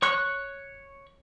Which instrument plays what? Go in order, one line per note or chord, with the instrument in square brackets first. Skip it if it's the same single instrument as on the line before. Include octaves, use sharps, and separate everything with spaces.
[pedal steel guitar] C#5 C#6 F#6